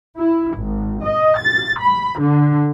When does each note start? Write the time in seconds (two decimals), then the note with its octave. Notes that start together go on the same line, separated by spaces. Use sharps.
0.17 E4
0.55 G#1
1.03 D#5
1.39 A6
1.80 B5
2.19 D3